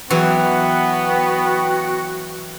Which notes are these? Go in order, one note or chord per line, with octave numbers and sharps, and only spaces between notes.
E3 F#3 B3 F#4 G5